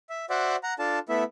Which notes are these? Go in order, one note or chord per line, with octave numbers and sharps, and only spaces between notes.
E5
F#4 C5 D5 E5 F#5
F#5 A#5
D4 F4 A4 A5
A3 B3 E4 E5